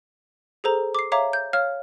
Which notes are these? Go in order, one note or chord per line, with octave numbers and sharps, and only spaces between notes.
G#4 A4 C5 A#5
D6 C7
C#5 E5 F5 A#5 D6
G6
C#5 F5 F6